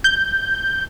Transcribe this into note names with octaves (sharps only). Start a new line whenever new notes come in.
G6